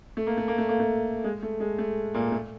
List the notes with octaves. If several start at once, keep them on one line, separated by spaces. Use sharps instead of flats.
A3
A#3
A3
A#3
A3
A#3
A3
G#3
A3
G#3
A3
A#2 A#3
A3